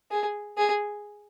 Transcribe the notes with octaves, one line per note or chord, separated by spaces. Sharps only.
G#4
G#4